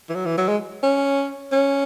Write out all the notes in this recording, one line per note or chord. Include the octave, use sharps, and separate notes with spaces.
E3
F#3
E3
F#3
G#3
C#4
C#4